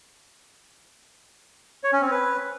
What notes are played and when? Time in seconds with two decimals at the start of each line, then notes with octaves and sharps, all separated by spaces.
1.84 C#5
1.93 C#4
2.02 C4
2.11 B4